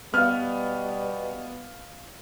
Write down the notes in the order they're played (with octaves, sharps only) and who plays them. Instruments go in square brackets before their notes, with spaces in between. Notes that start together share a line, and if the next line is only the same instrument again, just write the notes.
[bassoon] B2 [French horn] G3 [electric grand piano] B3 [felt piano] F5 F6